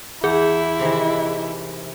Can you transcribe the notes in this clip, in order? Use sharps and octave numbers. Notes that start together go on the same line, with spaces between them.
E2 E4 G#4
C3 D#3 E3